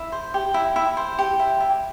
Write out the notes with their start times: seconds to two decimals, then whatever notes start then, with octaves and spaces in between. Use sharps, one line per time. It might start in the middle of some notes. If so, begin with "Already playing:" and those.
Already playing: E4
0.12 C5
0.34 G4
0.54 E4
0.76 E4
0.97 C5
1.19 G4
1.39 E4
1.60 E4